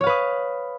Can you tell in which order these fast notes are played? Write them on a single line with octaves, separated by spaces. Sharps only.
C#5 F5 B4 D#6